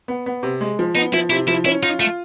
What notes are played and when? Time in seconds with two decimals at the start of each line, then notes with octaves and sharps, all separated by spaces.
0.08 B3
0.26 B3
0.43 C3
0.61 G#3
0.79 F3
0.95 B3 D#4
1.14 F3 E4
1.30 C3 E4
1.48 F3 E4
1.65 C#4 E4
1.83 D#4 F4
2.00 A3 F4